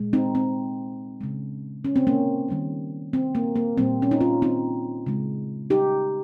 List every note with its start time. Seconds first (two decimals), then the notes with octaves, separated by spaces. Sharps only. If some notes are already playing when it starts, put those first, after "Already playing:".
Already playing: A#2 G#3
0.13 C4 D#4
0.35 C4
1.21 C#3 G#3
1.85 C#4
1.96 C4
2.07 A#3 C#4
2.48 D#3 G3 A#3
3.13 C4
3.35 A#3
3.56 A#3
3.77 A#2 G3 A#3 C4
4.02 C#4
4.11 D#4
4.21 C#4 F4
4.42 C4 D#4
5.06 C#3 G#3
5.70 D#4 G4